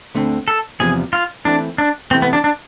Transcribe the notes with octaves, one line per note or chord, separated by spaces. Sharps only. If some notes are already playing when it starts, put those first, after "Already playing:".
D2 D3 A3 C4
A4
E2 C3 F3 B3 G#4
F4
E3 A3 C4 D4
D4
C3 E3 A3 C4
B3
D4
D4